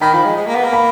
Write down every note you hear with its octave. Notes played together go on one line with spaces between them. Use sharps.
D#3 B5
F3
G#3
G#3
A#3
B3
A#3
B5